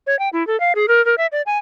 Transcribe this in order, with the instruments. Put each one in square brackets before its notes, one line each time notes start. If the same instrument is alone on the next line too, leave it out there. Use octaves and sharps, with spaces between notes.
[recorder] C#5
G5
E4
A4
F5
G#4
A#4
A#4
E5
D5
G#5